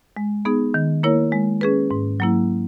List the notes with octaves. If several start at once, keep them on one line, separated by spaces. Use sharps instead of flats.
G#3
B3 D#4 G#4
D#3
A#3 E4 A#4 C#5
G#3
C#4 G#4 B4
G#2
F#3 A#3 E4